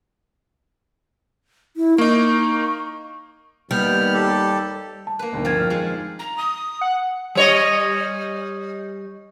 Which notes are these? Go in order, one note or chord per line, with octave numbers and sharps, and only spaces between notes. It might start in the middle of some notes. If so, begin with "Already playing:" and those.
E4
A#3 D#4 C#6
D#2 G3 B3 F6
G4 A4
A5
A#3 B4
G1 D2 D#3
F3 C4 G5 G#6
F2 D#3 F6
F3 G#3
A#5
D#6
F#5
G3 C#5 D#5